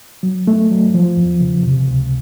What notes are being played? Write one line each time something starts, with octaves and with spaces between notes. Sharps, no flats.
F#3
A3
F#3
F3
E2
C#3
C3
C#2